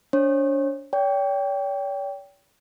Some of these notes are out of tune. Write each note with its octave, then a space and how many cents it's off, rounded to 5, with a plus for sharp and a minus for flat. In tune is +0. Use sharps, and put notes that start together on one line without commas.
D4 -35 C#5 -40
C#5 +45 G5 +0